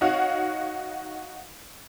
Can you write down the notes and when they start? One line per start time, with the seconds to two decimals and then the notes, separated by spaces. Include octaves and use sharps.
0.01 D#4 F#4 C#5 F5 F#5